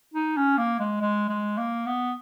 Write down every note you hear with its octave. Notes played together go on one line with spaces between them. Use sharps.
D#4
C#4
A#3
G#3
G#3
G#3
A#3
B3